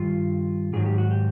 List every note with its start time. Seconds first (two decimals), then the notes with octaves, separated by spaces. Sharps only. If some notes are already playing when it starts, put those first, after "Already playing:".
Already playing: G2 D#3 F4
0.73 G#2 D#3 F#3 G#4
0.86 G4
0.98 F#4
1.11 G4